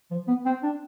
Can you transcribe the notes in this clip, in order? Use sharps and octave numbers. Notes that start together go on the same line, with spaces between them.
F3
B3
C4
D4